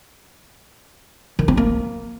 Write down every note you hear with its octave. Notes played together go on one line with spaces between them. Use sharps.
D#3
C4
A#3